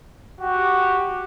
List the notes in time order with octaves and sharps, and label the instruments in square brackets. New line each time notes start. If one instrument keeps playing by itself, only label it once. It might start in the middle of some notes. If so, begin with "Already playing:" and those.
[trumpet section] F#4 G4